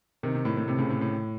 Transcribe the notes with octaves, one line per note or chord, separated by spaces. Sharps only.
C3 D#3
C3
A2
A2
C3
A2 C#3
A2
A2